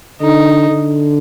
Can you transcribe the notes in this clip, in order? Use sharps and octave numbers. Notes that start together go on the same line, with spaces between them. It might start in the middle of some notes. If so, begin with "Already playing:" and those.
D3 D#4
D3